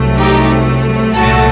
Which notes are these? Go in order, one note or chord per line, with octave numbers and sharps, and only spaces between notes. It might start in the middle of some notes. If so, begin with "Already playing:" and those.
Already playing: C2 C3 F#3 A3
D#4 G4
C2 A#2 F#3 A3 F#4 A4